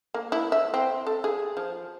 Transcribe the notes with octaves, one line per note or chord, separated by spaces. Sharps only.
A#3
E4
E5
C4
A4
G#4
F3